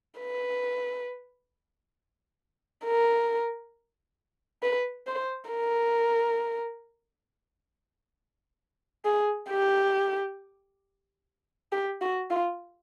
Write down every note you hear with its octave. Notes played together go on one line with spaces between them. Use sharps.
B4
A#4
B4
C5
A#4
G#4
G4
G4
F#4
F4